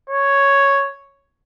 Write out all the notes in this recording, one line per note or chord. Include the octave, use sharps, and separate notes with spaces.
C#5